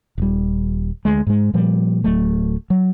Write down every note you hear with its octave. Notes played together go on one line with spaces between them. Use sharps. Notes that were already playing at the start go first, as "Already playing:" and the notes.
D#1 G3
D2 G#3
G#2 G#3
A#2 F3 G3
D1 F#3 A3
F#3